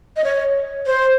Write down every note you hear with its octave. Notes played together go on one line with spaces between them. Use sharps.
D#5
C#5
C5